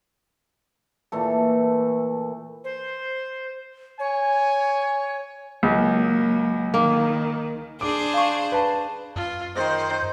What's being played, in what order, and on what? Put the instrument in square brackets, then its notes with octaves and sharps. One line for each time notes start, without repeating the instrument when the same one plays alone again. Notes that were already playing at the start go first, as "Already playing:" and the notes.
[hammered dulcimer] A#2 E3 A3 A4
[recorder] C5
[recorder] C#5 [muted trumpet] G#5
[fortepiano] C#2 [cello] F#3 A#3
[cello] D#3 [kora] A#3
[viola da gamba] D4 G#4 C5 [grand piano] D6
[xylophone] F5 C#6
[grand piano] B4 A5
[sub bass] F#2 [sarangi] F4
[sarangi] D#3 [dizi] C5